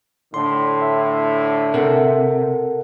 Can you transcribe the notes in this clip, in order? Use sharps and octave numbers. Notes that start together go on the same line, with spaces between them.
A2 D3 C6
E5
C3 A4 A#4 F#5